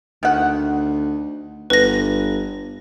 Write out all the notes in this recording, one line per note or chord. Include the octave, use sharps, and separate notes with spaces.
D2 D#3 F#5
G1 B4 A#6